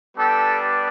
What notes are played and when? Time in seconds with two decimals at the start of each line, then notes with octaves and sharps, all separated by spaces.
0.17 G3 B3 D4 G4 A4